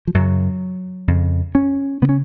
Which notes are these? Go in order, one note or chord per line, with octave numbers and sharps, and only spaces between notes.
F3
F#2 C#3 F#3
F2 C#3
C#4
C#3 B3
C#4